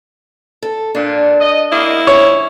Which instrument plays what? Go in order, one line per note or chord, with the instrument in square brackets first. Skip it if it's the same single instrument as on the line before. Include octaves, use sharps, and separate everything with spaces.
[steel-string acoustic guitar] A4
[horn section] A#2 [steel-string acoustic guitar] D4
[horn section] D#5
[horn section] A#3 D#5 [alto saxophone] E4
[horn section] F3 C#4 [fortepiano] C#5